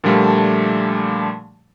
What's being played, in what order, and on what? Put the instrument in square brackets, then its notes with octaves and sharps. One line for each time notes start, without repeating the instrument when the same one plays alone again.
[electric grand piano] A#2 D3 F3 G3 A3 A#3